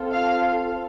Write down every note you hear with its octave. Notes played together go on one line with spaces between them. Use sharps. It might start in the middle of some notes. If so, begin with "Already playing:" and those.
Already playing: C4 F4 A4
F5